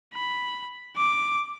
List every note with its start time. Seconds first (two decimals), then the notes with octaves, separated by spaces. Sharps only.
0.14 B5
0.97 D6